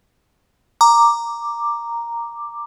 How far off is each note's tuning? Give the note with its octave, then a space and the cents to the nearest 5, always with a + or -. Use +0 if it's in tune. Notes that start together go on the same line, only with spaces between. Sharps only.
A#5 +0 D6 +5